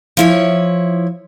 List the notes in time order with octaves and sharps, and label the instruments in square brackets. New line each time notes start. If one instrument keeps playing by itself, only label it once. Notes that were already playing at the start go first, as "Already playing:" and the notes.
[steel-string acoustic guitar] F3 E4 C#5